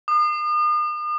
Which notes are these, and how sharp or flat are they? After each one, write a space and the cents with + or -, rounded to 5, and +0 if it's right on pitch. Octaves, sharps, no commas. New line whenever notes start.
D#6 -45